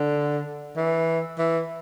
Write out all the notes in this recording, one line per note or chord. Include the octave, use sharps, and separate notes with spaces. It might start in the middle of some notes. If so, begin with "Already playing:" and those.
Already playing: D3
E3
E3